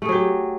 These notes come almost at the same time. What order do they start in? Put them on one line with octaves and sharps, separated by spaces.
A3 G#4 F#3 G4